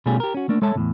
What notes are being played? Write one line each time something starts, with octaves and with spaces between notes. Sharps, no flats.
B2 G3 A3 C#4 F4 G#4
G4 A#4
C#4 F#4
A3 A#3 D4
G#3 A4 C#5 E5 A5
E2 A2 C3